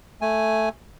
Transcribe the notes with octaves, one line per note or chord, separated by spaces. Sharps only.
A3 G#5